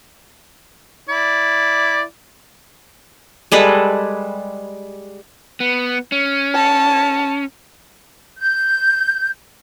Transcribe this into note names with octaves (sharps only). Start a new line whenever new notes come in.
E4 D5
G3 G#3 A4 B4
B3
C#4
A5
G6